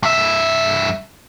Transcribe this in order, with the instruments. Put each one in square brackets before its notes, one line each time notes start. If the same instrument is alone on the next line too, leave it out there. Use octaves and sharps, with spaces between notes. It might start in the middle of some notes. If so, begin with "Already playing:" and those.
[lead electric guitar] G2 E5